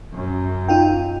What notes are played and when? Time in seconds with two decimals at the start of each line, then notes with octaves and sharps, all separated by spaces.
0.14 F#2
0.68 D#4 F4 G5